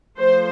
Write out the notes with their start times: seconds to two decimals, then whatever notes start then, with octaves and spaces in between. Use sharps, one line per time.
0.18 F3 A3 C5